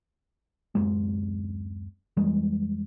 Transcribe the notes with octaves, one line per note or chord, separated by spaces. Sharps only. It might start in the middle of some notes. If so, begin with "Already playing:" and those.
D1 G1 F#2 G#3
F2 E3 G3 G#3